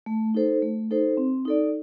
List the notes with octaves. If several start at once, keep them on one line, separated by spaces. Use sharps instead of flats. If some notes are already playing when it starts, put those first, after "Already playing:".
A3
D#4 A4 C5
A3
D#4 A4 C5
C4
D#4 A4 D5